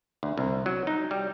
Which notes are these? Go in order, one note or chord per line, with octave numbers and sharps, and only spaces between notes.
D2
C2
F#3
D#4
G3